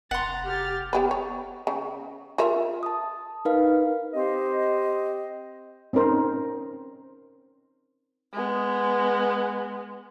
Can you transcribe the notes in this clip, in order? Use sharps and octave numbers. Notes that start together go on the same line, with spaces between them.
F1 F#5 A#5 C6 A6
G4 F6 A6
B3 G4 B4
C#5
C#3
F4 A#4 E5
A5 D#6
D#4 A#4 B4 F5
C4 G4 C5 D#5
C4 C#4 D#4 A#4 C5
G#3 B3